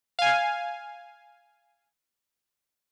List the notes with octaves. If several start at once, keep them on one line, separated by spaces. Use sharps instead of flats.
F5 G#5